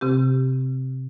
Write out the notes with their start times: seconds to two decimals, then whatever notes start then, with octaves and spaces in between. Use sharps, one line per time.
0.01 C3 C4 G4